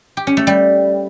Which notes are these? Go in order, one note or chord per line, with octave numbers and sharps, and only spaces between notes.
G4
C#4
A3
G3